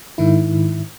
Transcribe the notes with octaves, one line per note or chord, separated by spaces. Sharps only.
G#2 D#3 E4